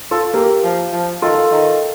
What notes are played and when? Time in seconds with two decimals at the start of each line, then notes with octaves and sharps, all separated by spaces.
0.11 F4 A4
0.34 A#3 G4 A#4
0.64 F3
0.93 F3
1.22 D#3 F4 A4
1.52 D#3